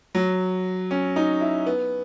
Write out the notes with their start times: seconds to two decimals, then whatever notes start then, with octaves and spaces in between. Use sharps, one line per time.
0.15 F#3
0.91 C#4
1.16 D#4
1.41 E4
1.67 B3